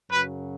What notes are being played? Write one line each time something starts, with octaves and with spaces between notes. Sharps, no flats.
F#2 C#3 F#3 B4